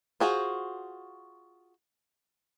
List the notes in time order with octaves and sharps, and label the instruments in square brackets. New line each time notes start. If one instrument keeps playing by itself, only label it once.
[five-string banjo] F4 F#4 G#4 C5